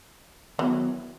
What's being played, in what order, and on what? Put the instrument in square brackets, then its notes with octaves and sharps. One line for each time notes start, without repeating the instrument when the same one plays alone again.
[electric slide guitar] D#3 F#3 B3 [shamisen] E3